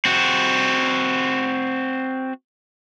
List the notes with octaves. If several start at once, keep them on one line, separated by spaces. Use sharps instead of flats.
C4 F#4